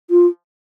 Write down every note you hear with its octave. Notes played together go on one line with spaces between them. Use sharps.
F4